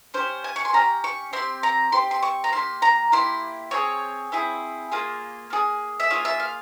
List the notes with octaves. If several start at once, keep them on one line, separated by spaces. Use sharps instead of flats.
C#4 G4 C5
G#5
C#6
C6
C#4 G4 A#5
C#6
C4 G4 C6
A#5
C4 G4 C6
C6
C#6
A#5
A#3 E4 G4 C6
A#5
A#3 E4 G4 C6
C4 E4 G#4 C#5
C4 E4 G#4
A#3 F4 G#4
A#3 F4 G#4
E5
A#3 F4 G#4 C#5
E5
F5